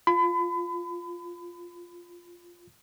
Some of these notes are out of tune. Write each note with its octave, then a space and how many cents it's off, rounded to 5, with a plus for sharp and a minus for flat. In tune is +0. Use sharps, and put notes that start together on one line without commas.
F4 +0 B5 +35